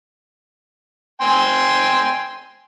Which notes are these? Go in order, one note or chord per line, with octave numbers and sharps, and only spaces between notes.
G5 G#5 C6